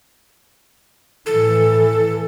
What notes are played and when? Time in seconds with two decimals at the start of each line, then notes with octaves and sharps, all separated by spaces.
1.26 A2 E3 A4